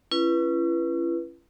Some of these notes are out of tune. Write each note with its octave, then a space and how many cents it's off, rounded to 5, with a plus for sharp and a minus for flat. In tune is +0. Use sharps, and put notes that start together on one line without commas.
C#4 +0 E4 +45 B4 -15